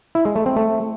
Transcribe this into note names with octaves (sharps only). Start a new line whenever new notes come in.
E4
G#3
A3
C4
A3